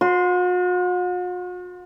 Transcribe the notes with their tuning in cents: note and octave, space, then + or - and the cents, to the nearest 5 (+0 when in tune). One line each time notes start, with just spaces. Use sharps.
F#4 -45 C6 +0